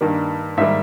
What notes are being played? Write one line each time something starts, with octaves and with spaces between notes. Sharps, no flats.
G2 D#3 G3 A#3
G#2 D#3 G3 A#3 E5